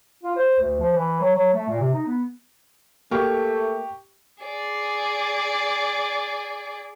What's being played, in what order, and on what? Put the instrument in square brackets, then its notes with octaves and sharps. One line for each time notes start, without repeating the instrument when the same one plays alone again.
[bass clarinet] F4
C5
D2
F3
E3
F#3
F#3
A3
A#2
C3
D#4
B3
[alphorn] A3 [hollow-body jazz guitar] A#3 [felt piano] G4 C#6
[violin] G#4 D5